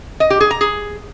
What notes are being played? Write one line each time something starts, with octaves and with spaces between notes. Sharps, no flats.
D#5
G4
G#4
A#5
G#4